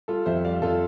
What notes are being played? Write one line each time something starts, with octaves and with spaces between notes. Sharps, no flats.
G3 F4 A4
F2 C5 E5
G3 D5 F5
F2 F4 A4